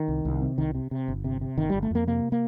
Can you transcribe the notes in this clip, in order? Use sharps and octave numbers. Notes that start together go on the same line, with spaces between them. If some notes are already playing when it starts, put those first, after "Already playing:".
Already playing: D#3
C2
C2
C3
C2 D#3
C3
C3
G1
C3
C3
G1 D#3
G1 G3
A3
F2 A#3
C3 A#3
A#3